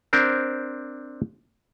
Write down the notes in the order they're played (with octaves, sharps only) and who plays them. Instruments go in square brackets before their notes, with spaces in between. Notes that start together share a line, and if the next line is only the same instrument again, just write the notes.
[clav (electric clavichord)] C4 D4 A#4 C5